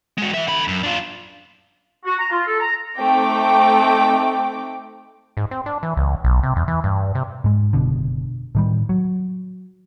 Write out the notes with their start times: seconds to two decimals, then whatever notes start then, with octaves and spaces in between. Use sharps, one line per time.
0.18 G#3 F#4
0.34 E3 E5
0.48 D3 B5
0.68 F#2
0.83 D4 F4
2.04 F#4
2.18 A#5
2.31 F4
2.46 A4
2.59 A#5
2.98 A3 C4 D#4 G5 D6
5.37 G#2
5.51 C4
5.66 D4
5.83 E3
5.97 C#2
6.24 B1
6.43 C3
6.56 E2
6.68 E3
6.84 G2
7.15 C3
7.44 G#2 G#3
7.73 F#1 C#2 B2 D3
8.55 A2 D#3 G3
8.89 F#3